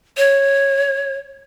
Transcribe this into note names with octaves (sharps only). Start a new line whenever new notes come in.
C#5